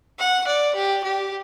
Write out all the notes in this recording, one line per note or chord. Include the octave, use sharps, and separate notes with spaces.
F#5
D5
G4
G4